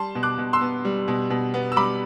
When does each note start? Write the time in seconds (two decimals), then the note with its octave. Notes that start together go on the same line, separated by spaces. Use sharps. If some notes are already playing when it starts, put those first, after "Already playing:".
Already playing: G3 A5 C6
0.15 B2
0.23 D6 F#6
0.38 B2
0.53 C6 E6
0.61 B3
0.85 G3
1.08 B2
1.30 B2
1.54 B3
1.72 E6
1.76 G3 B5 D6